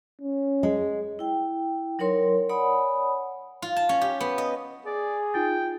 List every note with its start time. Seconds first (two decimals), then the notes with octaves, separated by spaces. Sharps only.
0.21 C#4
0.63 G#3
1.19 E4 G5
1.99 F#3 D#4 A#4 C#5 C6
2.49 C#5 D5 F#5 G#5 B5 D#6
3.62 F4
3.76 A5
3.89 C#4
4.01 G4
4.21 B3
4.38 D#5
4.86 G#4 D5
5.34 D#4 F4 G5 A6